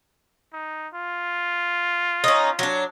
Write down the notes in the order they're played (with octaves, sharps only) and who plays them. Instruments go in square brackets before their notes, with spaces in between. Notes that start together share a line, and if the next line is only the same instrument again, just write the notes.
[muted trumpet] D#4
F4
[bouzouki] C#4 D#4
F#3 D4